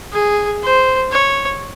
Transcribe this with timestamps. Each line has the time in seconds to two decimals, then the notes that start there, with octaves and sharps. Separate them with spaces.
0.13 G#4
0.63 C5
1.12 C#5